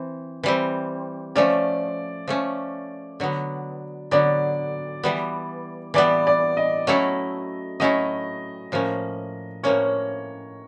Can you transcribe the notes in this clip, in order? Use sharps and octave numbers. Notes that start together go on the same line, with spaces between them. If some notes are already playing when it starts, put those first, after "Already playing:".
Already playing: E3 C4
E3 G3 C4
F3 A3 C#4 D5
F3 A3 C#4
D3 F#3 B3
D3 F#3 B3 D5
E3 G3 B3
E3 G3 B3 D5
D5
D#5
F#3 A3 C#4 E4 A4
F#3 A3 C#4 E4 A4 D#5
A2 F3 A#3 C#4
A2 F3 A#3 C#4 C#5